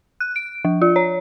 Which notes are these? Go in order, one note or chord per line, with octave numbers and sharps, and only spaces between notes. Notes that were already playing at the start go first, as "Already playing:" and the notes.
F#6
D7
F3
F4
C#5